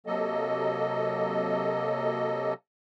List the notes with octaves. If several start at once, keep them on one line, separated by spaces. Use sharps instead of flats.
C3 F#3 A#3 A4 D#5